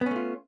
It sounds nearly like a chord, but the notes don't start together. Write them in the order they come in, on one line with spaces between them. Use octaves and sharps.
B3 C#4 A3 F4